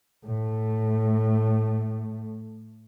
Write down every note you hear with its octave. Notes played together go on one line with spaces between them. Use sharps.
A2 A3